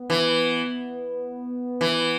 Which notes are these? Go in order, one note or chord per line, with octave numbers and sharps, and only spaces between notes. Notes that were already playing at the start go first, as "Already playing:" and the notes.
Already playing: B3
E3
E3